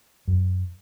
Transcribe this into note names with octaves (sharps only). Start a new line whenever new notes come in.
F#2